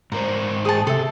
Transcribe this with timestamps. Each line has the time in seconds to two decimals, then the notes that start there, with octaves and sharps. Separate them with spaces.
0.12 G#2 A#4 C5 A#5
0.65 G#4 G5 A5
0.87 C3 A4 E5